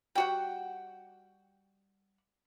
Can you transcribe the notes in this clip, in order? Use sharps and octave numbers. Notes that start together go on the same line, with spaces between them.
G3 F#4 F#5 G5